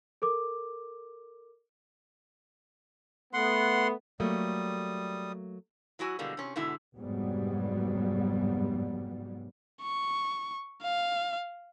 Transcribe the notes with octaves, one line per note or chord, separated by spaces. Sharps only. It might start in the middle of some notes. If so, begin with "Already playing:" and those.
A4 A#4 D6
A3 B3 F#5 C6
F#3 G3 A3 A#3 D#6
F#3 E4 F#4 G#5
B2 D3 G3 G#3 A#3
C3 C#4
G#2 B2 D3 E4
F1 G#2 F#3 G3 B3
C#6
F5